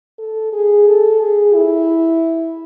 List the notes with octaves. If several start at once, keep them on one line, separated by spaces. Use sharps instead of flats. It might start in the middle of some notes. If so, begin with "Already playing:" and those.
A4
G#4
A4
G#4
E4